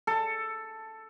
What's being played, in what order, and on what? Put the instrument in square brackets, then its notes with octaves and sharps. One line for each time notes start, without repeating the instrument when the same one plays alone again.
[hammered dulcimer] A4